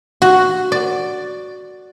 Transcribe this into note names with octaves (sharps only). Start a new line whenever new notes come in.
F#4
D5